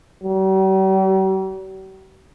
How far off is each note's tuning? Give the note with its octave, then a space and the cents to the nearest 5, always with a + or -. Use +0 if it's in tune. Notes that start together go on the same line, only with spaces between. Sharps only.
G3 -45